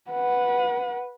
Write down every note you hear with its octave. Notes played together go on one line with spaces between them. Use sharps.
B4 F#5